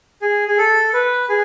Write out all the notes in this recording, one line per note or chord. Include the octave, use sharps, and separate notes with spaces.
G#4
G#4
A4
B4
G#4